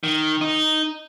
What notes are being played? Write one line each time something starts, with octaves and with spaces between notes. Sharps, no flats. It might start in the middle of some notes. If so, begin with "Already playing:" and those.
D#3
D#4